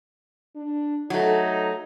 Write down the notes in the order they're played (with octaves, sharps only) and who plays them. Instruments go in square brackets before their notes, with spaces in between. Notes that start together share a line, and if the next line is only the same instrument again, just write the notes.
[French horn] D4
[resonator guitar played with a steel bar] F#3 A3 [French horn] D#4